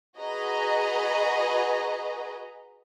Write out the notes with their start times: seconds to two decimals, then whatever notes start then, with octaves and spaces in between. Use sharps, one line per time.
0.18 F#4 G#4 B4 D#5 A#5